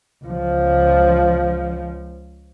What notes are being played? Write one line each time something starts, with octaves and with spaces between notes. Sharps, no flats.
C#2 F3